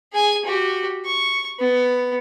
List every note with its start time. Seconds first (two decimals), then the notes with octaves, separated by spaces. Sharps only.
0.13 G#4 G#5
0.45 F#4 G4
1.05 C#6
1.59 B3